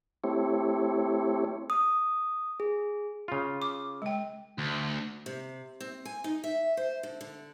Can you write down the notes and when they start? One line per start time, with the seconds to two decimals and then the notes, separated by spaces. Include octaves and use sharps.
0.24 A3 C4 E4 G4 C#5
1.70 D#6
2.60 G#4
3.28 C#3 F4
3.62 D6
4.02 G#3 G5
4.58 D2
5.26 C3
5.80 C4
6.05 G#5
6.24 D#4
6.44 E5
6.77 C5
7.03 D3
7.21 D3